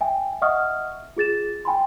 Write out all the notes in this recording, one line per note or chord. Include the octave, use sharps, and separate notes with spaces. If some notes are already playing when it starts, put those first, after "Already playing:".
E5 G5 G#5
D#5 E5 F#5 C#6 D#6 F6
F4 G#4 A6 E7
G5 G#5 B5 C6